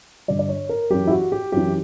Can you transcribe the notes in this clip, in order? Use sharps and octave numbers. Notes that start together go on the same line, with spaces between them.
G2 D3 D5
D5
C#5
A#4
F#2 E3 G4
E4
F#4
G4
F#2 E3 G4